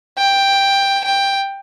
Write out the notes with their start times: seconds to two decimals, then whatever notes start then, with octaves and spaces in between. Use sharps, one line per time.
0.18 G5
1.05 G5